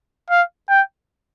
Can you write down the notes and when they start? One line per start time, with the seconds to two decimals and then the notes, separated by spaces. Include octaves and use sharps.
0.30 F5
0.69 G5